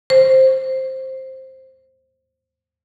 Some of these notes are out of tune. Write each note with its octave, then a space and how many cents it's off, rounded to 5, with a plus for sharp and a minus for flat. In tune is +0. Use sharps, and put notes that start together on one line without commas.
C5 +10